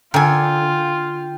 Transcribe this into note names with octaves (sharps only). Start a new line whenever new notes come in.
D3 F4 A#4 G5 G#5